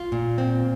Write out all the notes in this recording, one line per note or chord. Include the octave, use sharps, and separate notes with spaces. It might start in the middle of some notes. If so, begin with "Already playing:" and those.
Already playing: F4
A#2
C4